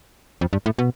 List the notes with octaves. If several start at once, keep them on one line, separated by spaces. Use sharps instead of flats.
F2
G2
A2
B2